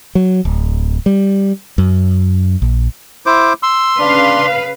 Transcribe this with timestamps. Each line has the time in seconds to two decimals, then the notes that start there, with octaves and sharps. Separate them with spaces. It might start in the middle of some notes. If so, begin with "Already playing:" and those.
0.15 F#3
0.45 D1
1.06 G3
1.78 F#2
2.62 A#1
3.26 E4 C5 D6
3.63 C6 E6
3.99 C#3 D4 B4 F5